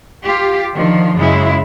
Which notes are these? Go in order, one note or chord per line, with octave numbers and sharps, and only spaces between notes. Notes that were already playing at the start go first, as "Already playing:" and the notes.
F4 G4
D3 D#3 F3
F#2 C#3 G#3 E4